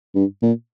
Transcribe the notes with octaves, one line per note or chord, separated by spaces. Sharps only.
G2
A#2